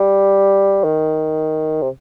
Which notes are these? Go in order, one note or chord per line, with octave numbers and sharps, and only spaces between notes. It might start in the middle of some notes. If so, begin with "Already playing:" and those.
Already playing: G3
D#3
C3